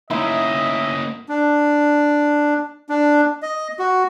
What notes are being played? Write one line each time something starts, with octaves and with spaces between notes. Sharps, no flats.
A#3 C#4 D#4 E4 D#5 E5
D4
D4
D#5
F#4